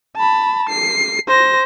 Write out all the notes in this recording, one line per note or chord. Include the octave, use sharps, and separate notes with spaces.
A5 B5
C7
C5 A#6